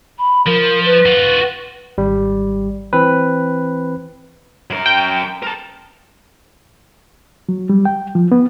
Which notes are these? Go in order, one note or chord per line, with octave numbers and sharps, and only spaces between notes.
B5
F3 A#4
B4
F4 F#4
G#1 G3
E3 C4 B4
F#2 A#4
G5
A#4 A5
F#3
G3
G5
F3
B3